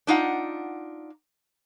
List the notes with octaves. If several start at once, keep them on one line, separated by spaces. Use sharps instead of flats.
D4 D#4 F4 F#5